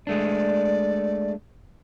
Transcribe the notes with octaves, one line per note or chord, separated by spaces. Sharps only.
G#3 A3 D4 D5